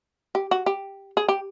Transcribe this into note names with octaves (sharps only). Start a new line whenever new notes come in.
G4
F#4
G4
G#4
G4